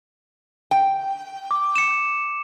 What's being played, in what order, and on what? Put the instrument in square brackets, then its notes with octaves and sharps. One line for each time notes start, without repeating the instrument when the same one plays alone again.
[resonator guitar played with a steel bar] G5
[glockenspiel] D6
C#7 E7